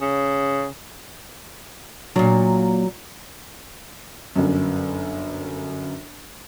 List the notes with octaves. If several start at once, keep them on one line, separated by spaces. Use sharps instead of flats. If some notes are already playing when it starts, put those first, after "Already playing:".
C#3
A#2 F#3 D4
G1 F#2